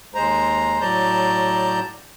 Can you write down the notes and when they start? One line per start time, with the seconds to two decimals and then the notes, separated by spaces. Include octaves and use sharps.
0.15 D#2 G#3 C5 A#5
0.81 A2 F#3 D5 A5 A#5 G6